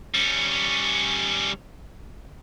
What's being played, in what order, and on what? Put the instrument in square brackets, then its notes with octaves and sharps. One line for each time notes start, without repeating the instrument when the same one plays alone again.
[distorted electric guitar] G3 C#4